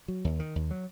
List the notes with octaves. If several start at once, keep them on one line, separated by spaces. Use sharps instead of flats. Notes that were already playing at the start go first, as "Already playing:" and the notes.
F#3
D#2
D#3
D#2
F#3